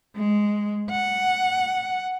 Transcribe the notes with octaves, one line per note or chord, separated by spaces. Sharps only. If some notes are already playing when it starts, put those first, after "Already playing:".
G#3
F#5